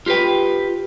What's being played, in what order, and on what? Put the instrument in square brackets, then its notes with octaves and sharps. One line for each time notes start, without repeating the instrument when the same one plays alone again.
[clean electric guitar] F4 G4 A4 B4 G5